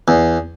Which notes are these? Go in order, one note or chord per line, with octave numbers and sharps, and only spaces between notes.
E2